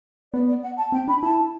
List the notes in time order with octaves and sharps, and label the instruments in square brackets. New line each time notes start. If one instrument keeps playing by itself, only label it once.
[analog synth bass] B3 [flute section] D5
[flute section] D5
F#5
A5
[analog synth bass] C4 [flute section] G5
[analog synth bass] D4 [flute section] B5
[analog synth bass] E4 [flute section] A5